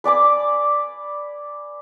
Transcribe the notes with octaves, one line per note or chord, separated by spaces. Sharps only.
B4 D5 G#5 D6